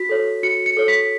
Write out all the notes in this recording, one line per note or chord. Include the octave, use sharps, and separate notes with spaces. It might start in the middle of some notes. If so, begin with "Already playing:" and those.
Already playing: F#4 B6
A4 C#5
F#4 C#7
C#7
A4 C#5
B6